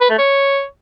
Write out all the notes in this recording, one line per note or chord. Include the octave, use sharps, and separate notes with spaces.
B4
A3
C#5